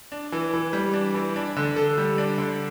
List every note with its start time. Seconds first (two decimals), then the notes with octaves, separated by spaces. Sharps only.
0.12 D4
0.32 E3
0.53 E3
0.73 G3
0.94 D4
1.14 E3
1.36 D4
1.56 D3
1.76 A4
1.98 G3
2.18 D4
2.38 D3